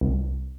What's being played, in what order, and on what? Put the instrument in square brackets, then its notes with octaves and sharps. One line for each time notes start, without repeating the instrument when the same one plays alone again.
[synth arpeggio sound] C2